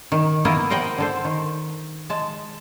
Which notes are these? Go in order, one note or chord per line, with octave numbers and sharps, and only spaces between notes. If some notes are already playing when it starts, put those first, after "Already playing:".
D#3
A#3 B3 E4 A#4 D#5
A#4 C5 D#5 F#5 G5
D3 A4 C5
D#3
G#3 A5